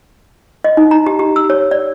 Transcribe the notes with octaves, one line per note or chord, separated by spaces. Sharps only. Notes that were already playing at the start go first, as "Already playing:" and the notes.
D#5
D#4
A#5
G4
G4
E6
C#5
D5